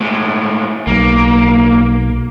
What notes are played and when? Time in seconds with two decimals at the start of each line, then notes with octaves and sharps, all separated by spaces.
0.01 A2 G#3
0.87 B1 A#3